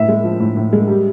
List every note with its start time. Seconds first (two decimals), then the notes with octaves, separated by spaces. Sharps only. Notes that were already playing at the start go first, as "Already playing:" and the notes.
Already playing: A2 E5
0.08 G#3
0.24 F3
0.40 A2
0.57 A2
0.73 G#3
0.88 G3